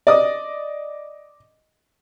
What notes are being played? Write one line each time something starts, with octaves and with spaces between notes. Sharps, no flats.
D5 D#5 D#6